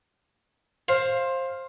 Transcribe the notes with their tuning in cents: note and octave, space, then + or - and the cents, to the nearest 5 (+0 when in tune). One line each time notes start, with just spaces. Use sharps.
C5 +20 F5 +0